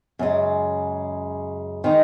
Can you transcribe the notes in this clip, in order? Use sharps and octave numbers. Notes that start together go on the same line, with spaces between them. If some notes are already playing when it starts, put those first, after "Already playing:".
F#2 C#3 G#3
D#3 G#3 D#4